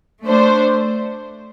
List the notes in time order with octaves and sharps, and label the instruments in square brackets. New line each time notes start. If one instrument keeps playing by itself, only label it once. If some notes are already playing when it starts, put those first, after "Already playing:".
[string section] A3 D4 C5